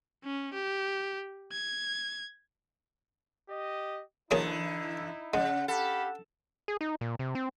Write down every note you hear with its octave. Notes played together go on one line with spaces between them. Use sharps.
C#4
G4
G#6
G4 D#5
D3 E3 F#3 A#3 D#4 E4 G#4
C#3 G#3 F#5
G4 A4 F5 F#5 B5
G#4
D#4
A#2
C3
C4